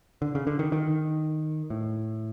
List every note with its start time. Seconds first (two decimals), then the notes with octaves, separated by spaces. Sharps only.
0.22 D3
0.35 C#3
0.47 D3
0.59 D#3
0.72 D#3
1.70 A2